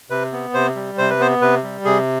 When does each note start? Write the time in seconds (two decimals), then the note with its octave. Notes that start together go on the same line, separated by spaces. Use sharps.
0.10 C3 B4
0.32 B3
0.54 C3 C5
0.76 G3
0.98 C3 C5
1.10 B4
1.20 B3 C5
1.41 C3 B4
1.63 G3
1.85 C3 G#4